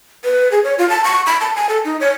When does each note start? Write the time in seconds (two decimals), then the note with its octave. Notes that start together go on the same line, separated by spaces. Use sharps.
0.24 B4
0.52 G#4
0.64 C#5
0.78 F4
0.90 A5
1.04 C#6
1.26 B5
1.41 A5
1.56 G#5
1.69 A4
1.85 D#4
2.01 C#5